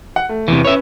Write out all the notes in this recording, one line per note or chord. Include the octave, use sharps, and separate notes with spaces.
F#5
A3
E2 C3 E3
C#4 B4 C#5 E5